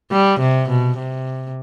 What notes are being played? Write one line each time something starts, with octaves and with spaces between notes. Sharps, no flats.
G3
C3
B2
C3